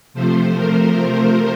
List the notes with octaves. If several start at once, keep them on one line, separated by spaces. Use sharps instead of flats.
C3 F3 A3 C5
A#4
C5